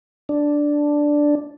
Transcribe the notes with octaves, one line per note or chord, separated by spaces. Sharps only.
D4